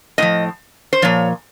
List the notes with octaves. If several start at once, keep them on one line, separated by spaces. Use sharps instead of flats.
A2 F3 D#5
C5
A#2 F3 C#5